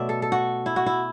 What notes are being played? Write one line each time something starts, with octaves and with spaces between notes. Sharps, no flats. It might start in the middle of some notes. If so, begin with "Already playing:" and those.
Already playing: B2 F#3 A3 D5 E5
A4
A4
F#4
E4
F#4
E4